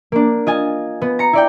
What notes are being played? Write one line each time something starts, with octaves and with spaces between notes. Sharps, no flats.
A#3 D4
F4 D#5 G#5
B3
A#5 C#7
E4 D5 G5